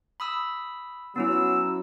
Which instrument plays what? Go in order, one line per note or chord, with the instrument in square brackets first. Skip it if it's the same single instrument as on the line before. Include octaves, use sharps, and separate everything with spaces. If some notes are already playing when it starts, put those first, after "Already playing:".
[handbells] B5 D#6 E6
[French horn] F#3 [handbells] B3 C#4 E4 [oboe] E6